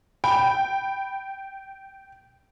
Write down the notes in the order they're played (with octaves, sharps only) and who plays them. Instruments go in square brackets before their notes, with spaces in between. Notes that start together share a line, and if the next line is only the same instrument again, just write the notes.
[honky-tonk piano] G5 [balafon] B5